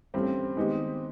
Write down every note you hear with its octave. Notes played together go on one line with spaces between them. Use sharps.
G2 E3 A3 C4 C#4
D#3 G#3 B3 D#4 G4